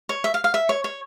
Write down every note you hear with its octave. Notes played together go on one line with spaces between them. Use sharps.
C#5
E5
F5
F5
E5
C#5
C#5